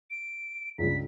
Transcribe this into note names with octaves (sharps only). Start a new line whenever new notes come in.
D7
C#2 G2 C#3 B6